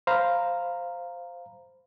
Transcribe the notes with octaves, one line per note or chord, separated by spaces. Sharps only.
C5 F5 A#5 B5